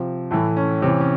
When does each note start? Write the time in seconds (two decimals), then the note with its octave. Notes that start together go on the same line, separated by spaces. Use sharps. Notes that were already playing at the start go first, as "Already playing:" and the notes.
Already playing: C3 F3
0.31 A2 E3 A3
0.57 C#4
0.82 C3 E3 C#4
1.00 C#4